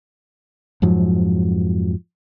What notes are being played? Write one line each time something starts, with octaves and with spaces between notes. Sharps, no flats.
F2 G#2 F3 F#3